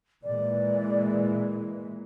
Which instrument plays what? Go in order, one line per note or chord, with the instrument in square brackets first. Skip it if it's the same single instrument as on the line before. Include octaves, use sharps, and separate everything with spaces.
[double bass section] A#2 E3 G#3 [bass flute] D5